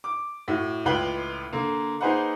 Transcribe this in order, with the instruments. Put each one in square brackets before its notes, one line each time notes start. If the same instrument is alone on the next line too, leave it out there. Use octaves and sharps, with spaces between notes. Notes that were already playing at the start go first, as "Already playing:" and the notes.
[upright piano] D6
A2 F#4
C#2 A2 F4 B4 G5 F#7
D3 A#3
A#3 D#4 G#4 B4 C5 F#5